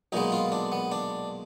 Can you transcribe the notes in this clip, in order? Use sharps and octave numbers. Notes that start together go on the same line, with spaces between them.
B1 A#2 G#3 B3 D#4
F4
D4
B3
D4